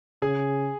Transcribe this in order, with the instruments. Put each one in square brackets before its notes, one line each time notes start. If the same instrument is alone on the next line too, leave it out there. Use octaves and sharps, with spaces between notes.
[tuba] C#3 [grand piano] G#4 G#5